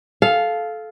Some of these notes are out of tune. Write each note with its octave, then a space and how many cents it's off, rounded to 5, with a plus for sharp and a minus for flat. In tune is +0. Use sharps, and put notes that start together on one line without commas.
A4 -20 F5 +0